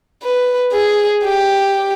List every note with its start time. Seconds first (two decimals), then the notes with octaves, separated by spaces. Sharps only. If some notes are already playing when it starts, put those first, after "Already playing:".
0.23 B4
0.72 G#4
1.24 G4